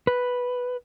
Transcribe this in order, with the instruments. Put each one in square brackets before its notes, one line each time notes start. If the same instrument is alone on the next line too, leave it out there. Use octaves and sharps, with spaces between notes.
[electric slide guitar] B4